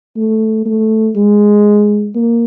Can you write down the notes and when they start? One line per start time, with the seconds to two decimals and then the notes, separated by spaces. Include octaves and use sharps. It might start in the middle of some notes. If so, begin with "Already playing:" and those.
0.17 A3
0.66 A3
1.16 G#3
2.15 A#3